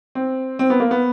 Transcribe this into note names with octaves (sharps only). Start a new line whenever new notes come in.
C4
C4
B3
A#3
B3